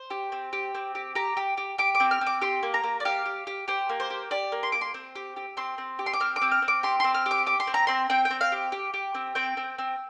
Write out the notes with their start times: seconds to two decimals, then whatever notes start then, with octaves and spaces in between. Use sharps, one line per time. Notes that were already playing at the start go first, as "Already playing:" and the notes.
Already playing: C5
0.10 G4
0.32 C4
0.53 G4
0.75 C4
0.95 G4
1.15 G4 A#5
1.37 G4
1.57 G4
1.78 G4 D6
1.95 D6
2.00 C4
2.11 F6
2.21 C4
2.27 D6
2.42 G4 C6
2.63 A#3
2.74 A#5
2.84 A#3
3.00 D5
3.05 G4 F5
3.26 G4
3.47 G4
3.68 G4 C5
3.89 A#3
4.00 C5
4.10 G4
4.31 G4 D5
4.52 A#3
4.63 C6
4.72 A#3 D6
4.81 C6
4.94 C4
5.15 G4
5.36 G4
5.57 C4 C6
5.78 C4
5.99 G4
6.06 C6
6.13 D6
6.20 C4 F6
6.36 D6
6.41 C4
6.52 F6
6.62 C4
6.68 D6
6.83 G4 C6
7.00 C4 C6
7.14 F6
7.26 G4
7.31 D6
7.46 G4 D6
7.60 C6
7.67 C4
7.74 A#5
7.87 C4 C6
8.10 C4 G5
8.25 G5
8.30 C4
8.41 F5
8.52 G4
8.72 G4
8.94 G4
9.14 C4
9.35 C4 G5
9.57 C4
9.78 C4